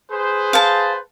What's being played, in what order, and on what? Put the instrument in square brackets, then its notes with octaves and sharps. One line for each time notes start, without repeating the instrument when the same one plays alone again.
[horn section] G#4 B4 C5
[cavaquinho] F5 A5